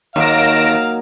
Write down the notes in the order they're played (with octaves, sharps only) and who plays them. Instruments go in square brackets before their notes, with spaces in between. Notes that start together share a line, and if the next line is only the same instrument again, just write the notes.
[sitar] D#2 [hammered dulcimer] F#3 A#3 D#4 [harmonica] F5 [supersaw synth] A#6 D7 E7